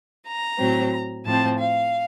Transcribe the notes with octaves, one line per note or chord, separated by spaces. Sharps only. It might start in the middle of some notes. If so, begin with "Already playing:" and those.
A#5
A2 F#3 C4
A2 F3 C4 A5
F5